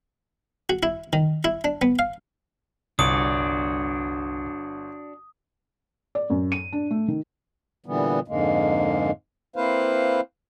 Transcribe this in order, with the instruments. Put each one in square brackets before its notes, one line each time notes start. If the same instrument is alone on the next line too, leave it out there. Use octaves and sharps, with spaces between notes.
[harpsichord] F#4
E4
D#3
E4
D4
B3
F5
[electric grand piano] G1 [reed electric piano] C2 [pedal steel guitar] D4 F#4 D5 [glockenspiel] D#6
[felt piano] D5
F#2
D#7
D4
A3
D#3
[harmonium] A#2 D3 E3 G3 B3
F2 G#2 D3 G#3 A#3
A#3 C4 E4 B4 C5 F5